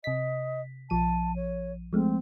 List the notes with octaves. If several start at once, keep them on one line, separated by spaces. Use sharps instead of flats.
C3 D#5 B6
A#1 F3 A5 D#7
C#5
F3 G#3 A3 C4